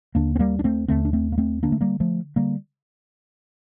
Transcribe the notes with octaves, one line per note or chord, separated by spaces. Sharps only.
D#2 D3 A#3 D4
C4
G3 A#3
D4
A3 C4
D#2 D3 A3 C4
D4
A3 C4
A#3
A3 C4
D2 D3 A#3 D4
A3
G3 A#3
F3 A3
D3 G3 A#3